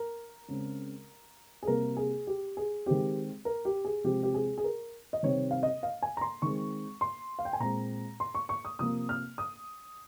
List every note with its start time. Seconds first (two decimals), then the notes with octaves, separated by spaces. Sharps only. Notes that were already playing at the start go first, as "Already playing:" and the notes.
Already playing: A#4
0.48 C#3 G#3 C4
1.63 G#4
1.67 C3 G3 A#3 A#4
1.97 G#4
2.27 G4
2.57 G#4
2.86 D#3 G#3 C4 G4
3.45 A#4
3.65 G4
3.85 G#4
4.04 C3 F3 G#3 C4 G4
4.23 G4
4.34 G#4
4.58 G#4
4.64 A#4
5.13 D#5
5.23 C3 D#3 G3 C4 C#5
5.51 F5
5.63 D#5
5.83 F5
6.02 G#5
6.17 A#5
6.21 C6
6.42 D#3 G#3 C4 C#6
7.01 C6
7.39 F5
7.45 G5
7.53 G#5
7.60 A#2 G#3 C4 A#5
8.20 C6
8.35 C#6
8.49 C#6
8.65 D#6
8.79 C3 F3 A#3 D#6
9.09 F6
9.38 D#6